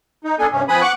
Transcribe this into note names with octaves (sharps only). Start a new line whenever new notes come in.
D#4
B3 D4 A4 G#5
G2 C3 C#4
F3 C4 B4 G#5 B5 D#6
F#5 C#6 D6 F#6